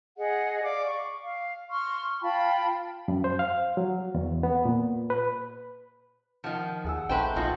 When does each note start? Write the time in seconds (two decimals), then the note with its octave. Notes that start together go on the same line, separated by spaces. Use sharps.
0.18 G#4 D#5 F#5
0.63 D5 F5 D6
0.87 C#6
1.24 F5
1.69 C6 C#6 F6
2.21 F4 G5 A5 B5
3.08 F#2
3.24 C5
3.39 F5
3.77 F#3
4.15 E2
4.43 B3
4.65 A#2
5.10 B4
6.44 D#3 F3 F#5
6.85 D#2 G#4 F#5 E6
7.09 A#1 A3 D#4 B4 C5 G5
7.36 A#1 B2 D#4 F4 F#4